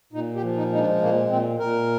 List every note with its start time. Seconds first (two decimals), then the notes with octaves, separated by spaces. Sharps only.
0.13 A#2 D#4
0.35 G4
0.42 F3
0.57 D#4
0.71 G#3 D#4
0.79 D4
1.01 A#2 A#3
1.29 A#2 C4
1.59 A#2 A#4